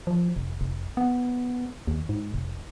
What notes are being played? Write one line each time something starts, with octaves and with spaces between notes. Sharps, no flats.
F3
F1
F1
B3
D#2
G#2
F1